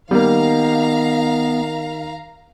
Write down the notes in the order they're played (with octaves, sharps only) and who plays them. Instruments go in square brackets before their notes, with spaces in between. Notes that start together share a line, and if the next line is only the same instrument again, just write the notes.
[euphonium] D#3 [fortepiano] G3 A#3 [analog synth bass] B3 [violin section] F5 A#5